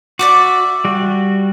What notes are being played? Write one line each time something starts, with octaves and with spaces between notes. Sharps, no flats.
F#4 D5 E5 D6
G3 F#4